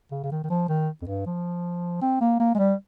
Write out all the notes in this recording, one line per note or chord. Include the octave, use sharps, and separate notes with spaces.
C#3
C#3
D#3
D#3
F3
D#3
F2
G2
F3
C4
A#3
A#3
G#3
G3